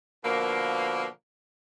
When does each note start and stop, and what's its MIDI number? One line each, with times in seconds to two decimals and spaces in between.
0.24 1.06 47
0.24 1.06 50
0.24 1.06 53
0.24 1.06 58